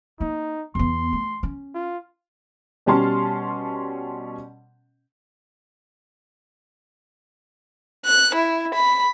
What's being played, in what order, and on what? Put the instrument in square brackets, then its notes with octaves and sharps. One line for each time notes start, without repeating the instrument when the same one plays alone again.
[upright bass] A#3 [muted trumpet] D#4
[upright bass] E2 B3 [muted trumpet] C6
[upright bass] A3
C#4
[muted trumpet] F4
[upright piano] B2 G3 C#4 A5 C6 F6
[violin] F#6
E4
B5